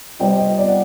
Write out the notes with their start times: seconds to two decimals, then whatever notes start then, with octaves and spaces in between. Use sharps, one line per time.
0.20 C3 G3 C4 D#5 G5
0.39 D#5
0.57 D5
0.68 F#5